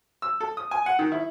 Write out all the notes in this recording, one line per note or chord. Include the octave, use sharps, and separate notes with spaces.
E6
A4
D#6
G#5
F#5
D#3
E4